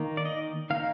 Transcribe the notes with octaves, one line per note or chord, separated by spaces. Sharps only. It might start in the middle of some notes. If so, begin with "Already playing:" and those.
Already playing: D#3 A#3 D#4
D5
D#5
D#3 A#3 D#4 F5